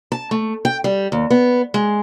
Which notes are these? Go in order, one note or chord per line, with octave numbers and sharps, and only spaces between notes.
A5
A3
G5
G3
D#2
B3
G#3